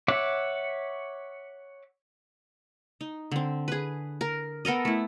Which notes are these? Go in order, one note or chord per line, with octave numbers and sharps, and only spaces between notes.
C#5 E5 F#5 D6
D#4
D3 C4
G#4 B4
A#4
B3 A4 A#4 D#5
A3 E4